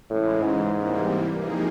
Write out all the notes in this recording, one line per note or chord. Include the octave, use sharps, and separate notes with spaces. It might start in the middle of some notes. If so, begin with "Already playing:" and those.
A2 C#3 E3 G#3
G#2
C3 E3 G3 A#3
C3 F3 A#3 D#4 G#4